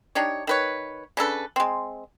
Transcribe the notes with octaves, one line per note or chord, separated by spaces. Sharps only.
D4 D#4 G4 C#5
D#3 B4 C#5
C#3 D4 A4 B4
G#3 C4